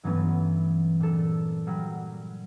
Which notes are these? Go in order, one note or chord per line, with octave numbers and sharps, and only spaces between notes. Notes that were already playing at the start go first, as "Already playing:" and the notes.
G2 E3 F#3 A3 B3 C#4
A#2 A4
F#3 G3